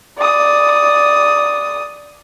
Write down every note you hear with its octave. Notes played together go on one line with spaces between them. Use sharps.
D5 D#6